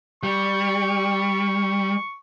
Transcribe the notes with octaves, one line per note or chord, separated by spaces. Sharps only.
G3 C#6